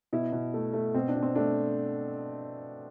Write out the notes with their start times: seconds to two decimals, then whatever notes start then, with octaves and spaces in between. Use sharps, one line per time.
0.13 B2 E4
0.32 B2
0.54 A3
0.73 A3
0.94 B2 C4
1.09 D4
1.16 B2
1.23 C4
1.35 A3 D4